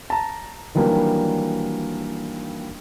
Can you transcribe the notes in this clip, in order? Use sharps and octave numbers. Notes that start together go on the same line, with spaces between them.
A5 A#5
D#3 E3 F#3 G3 A#3 D4